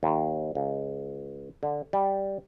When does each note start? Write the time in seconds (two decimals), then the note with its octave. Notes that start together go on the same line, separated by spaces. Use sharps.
0.03 D#2
0.55 C#2
1.63 D3
1.93 G3